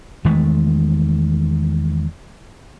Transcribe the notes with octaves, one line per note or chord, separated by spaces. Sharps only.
E2 D#3 G#3 A3